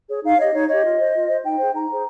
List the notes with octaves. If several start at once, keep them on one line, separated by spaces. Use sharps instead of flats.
G#4 C#5
D#4 F5
G4 C#5 D#5
D#4 C#5
G4 C#5 D#5
F4
C5
F4
C5
D#4 G5
G#4 C5
D#4 A#5
G#4 C5